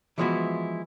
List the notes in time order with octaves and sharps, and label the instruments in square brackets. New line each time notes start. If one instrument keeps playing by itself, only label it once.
[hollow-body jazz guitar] E3 F3 G#3 B3 E4 F#4